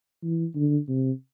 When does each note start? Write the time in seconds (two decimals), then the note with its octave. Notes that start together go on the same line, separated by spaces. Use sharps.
0.23 E3
0.55 D3
0.88 C3